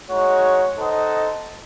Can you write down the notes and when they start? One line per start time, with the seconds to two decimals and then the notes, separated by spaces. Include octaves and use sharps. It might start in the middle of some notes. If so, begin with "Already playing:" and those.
0.10 G#3 D#4 F#4 C#5
0.76 D#4 A4 C5 D#5 F#5